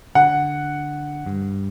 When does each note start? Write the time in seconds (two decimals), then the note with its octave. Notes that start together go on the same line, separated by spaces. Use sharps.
0.15 D3 F#5
1.26 G2